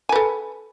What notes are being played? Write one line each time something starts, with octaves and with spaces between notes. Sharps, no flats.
A4 B4 G#5